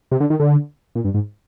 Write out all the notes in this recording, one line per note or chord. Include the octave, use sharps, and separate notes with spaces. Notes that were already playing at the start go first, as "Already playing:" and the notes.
C3
D3
D#3
D3
A#2
G2
G#2